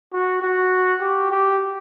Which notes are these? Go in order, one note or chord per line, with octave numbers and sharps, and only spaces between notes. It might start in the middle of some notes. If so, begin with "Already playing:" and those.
F#4
F#4
G4
G4